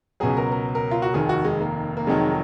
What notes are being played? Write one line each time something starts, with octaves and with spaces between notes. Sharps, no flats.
C#2 B2 F#3 G#4
A#4
A#4
A#4
F4
F#4
F1 D#2 D#3 G#4
F#4
G#3
A#3
A#3
F1 F2 D#3 F#3 G#3